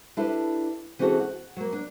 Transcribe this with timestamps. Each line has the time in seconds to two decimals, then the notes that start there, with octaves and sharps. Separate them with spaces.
0.17 D4 E4 G4 A4 B4
0.99 E3 C4 C#4 F#4 G#4 A4
1.20 F#5
1.56 F#3 A#3
1.73 D4